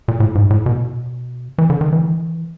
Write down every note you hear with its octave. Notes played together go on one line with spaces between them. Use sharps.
A#2
A2
G#2
A2
B2
E3
D3
D#3
E3